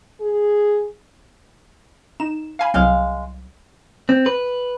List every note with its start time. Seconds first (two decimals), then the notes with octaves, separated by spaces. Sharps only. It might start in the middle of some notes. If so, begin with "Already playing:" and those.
0.21 G#4
2.20 D#4 E7
2.59 F5 G#5 B5
2.74 C2 F#3 G#3 F5
4.09 C4
4.26 B4